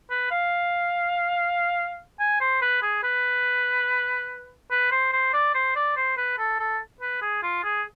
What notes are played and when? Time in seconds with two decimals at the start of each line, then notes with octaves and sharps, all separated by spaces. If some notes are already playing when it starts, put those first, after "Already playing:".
0.10 B4
0.31 F5
2.19 G#5
2.41 C5
2.62 B4
2.82 G#4
3.03 B4
4.71 B4
4.92 C5
5.13 C5
5.33 D5
5.55 C5
5.76 D5
5.96 C5
6.17 B4
6.38 A4
6.59 A4
7.01 B4
7.22 G#4
7.43 F4
7.64 G#4